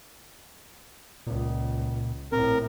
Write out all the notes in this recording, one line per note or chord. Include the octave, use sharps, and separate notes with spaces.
C#2 A#2
A#1 A2 C4 A#4